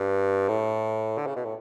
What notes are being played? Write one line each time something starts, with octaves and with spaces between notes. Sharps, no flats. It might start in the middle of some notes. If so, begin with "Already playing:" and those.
Already playing: G2
A2
D3
C#3
B2
A2